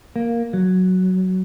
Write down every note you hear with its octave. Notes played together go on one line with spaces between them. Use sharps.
A#3
F#3